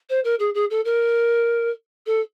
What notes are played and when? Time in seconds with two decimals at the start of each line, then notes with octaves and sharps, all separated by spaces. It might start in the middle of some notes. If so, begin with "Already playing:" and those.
0.09 C5
0.24 A#4
0.39 G#4
0.54 G#4
0.70 A4
0.85 A#4
2.06 A4